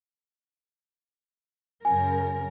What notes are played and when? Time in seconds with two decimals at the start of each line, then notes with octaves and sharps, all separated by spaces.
1.85 F#2 C#3 A#4 G#5